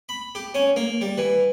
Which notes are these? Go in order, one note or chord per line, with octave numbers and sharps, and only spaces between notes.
B5
G4
C#4
A#3
G3
E3